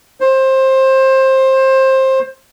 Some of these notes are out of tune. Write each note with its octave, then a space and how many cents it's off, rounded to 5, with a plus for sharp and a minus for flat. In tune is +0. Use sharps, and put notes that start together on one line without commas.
C5 +20